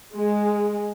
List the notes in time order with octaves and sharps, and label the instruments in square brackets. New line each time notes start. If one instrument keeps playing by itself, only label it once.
[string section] G#3